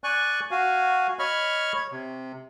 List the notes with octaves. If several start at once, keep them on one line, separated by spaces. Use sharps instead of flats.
D5 G#5 C#6 F#6
F#4 F5 G#5
C#5 D#5 B5 C#6 F6
C#5
C3